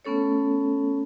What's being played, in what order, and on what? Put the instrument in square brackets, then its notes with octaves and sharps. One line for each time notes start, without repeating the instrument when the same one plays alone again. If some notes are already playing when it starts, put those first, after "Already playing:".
[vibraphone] A3 B3 C#4 A4 C#5